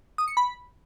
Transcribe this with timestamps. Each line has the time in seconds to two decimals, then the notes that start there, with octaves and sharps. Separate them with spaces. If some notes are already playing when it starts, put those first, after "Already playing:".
0.18 D#6
0.28 C#7
0.37 B5